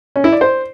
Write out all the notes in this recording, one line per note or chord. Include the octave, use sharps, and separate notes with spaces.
C#4
E4
D5
C5